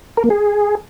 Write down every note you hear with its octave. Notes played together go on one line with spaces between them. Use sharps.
A#4
A#3
G#4